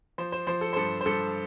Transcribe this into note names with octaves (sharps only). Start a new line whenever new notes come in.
F3 C5
C5
F3 C5
A4
C5
G2 A4
C5
G2 A4